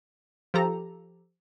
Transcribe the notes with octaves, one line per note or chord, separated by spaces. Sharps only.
F3 G4 A4 A#5